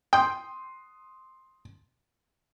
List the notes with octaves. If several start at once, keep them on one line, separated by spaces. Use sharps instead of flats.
G5 C6 D#6